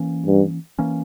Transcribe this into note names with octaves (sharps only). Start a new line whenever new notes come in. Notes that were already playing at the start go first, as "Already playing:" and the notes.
Already playing: E3 A#3 C#4
G2
E3 A#3 C#4